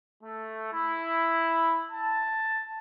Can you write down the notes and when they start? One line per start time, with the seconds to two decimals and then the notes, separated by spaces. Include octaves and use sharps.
0.23 A3
0.72 E4
1.90 A5